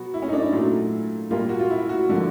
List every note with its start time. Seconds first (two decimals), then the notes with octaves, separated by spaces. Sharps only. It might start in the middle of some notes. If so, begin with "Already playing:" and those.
Already playing: B2 F#3 B3 F#4
0.14 E4
0.22 C#4
0.28 D#4
0.33 D4
0.42 E4
0.52 A#2 F#3 A3
1.31 A#2 G3 A#3 F4
1.49 F#4
1.59 F4
1.70 E4
1.89 F#4
2.09 D3 F3 A#3